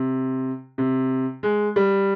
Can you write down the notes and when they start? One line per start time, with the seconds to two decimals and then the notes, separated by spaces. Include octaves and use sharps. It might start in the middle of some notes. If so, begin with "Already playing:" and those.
Already playing: C3
0.78 C3
1.43 G#3
1.76 G3